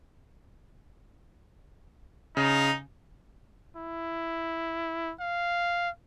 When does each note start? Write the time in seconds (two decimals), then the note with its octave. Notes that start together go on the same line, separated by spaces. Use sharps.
2.37 C#3 D#4
3.77 E4
5.20 F5